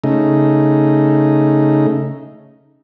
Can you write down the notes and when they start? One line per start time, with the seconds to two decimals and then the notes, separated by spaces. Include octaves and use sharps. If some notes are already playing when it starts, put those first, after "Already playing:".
0.04 C#3 A3 D#4